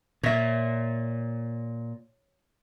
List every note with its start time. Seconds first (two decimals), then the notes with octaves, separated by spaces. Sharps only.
0.23 A#2 C#5 E5